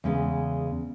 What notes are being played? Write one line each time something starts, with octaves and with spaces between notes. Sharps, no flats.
E2 C#3 G#3 B3